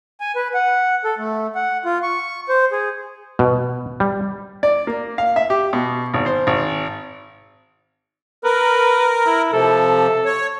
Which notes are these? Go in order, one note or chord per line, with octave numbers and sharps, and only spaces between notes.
G#5
B4
F#5
A4
A3
F#5
F4
C#6
C5
G#4
B2
G3
D5
A#3
F5
E5
G4
B2
G#1
C5
G#1
A#4 B4
E4
C3 F3 A4
C#5